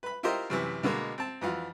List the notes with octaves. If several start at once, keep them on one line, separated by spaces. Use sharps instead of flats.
B4 B5
E4 F4 G4 A#4 C5 D#5
F#2 C3 E3
B2 D3 G#3 A#3
C4 A5
F2 E3 F4 F#4